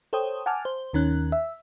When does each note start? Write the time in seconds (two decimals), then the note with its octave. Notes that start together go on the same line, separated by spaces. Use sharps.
0.13 A4 C5 C#5 G5 D#6
0.46 F#5 G#5 A5 D6 F6
0.65 C5
0.93 D#2 D#3 C#4 F#6
1.32 E5